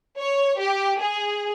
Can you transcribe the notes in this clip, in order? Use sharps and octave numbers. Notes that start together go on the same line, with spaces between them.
C#5
G4
G#4